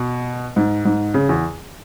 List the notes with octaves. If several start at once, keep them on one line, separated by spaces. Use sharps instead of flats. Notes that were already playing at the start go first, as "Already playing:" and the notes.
Already playing: B2
G#2
G#2
C#3
E2